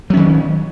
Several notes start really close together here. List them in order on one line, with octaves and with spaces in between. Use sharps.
F#3 C#4 D#3